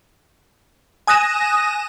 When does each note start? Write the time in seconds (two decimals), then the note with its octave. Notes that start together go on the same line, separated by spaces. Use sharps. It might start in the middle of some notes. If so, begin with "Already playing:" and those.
1.07 G#5 D#6 F#6 A#6 D#7 E7